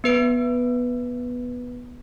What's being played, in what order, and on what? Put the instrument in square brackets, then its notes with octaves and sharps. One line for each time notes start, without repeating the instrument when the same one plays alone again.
[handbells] B3 B4 D7